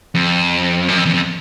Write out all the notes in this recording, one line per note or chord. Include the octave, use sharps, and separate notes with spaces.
F2
F#2
F2
E2
F2